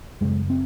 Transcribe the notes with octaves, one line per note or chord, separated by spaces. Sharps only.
F#2 C#3 G#3
C4